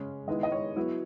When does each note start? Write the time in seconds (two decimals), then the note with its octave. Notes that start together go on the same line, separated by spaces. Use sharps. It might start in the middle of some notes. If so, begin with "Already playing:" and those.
Already playing: C#3 G#3 C#4
0.27 D#3 G#3 B3 E4 D#5
0.43 D#5
0.52 C#5
0.76 F#3 B3 E4